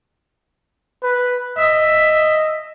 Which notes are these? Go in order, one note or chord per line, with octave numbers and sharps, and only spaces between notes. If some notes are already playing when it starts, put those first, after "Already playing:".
B4
D#5 E5